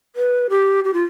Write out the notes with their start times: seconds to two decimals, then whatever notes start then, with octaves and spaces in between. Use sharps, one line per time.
0.16 B4
0.50 G4
0.84 G4
0.94 F4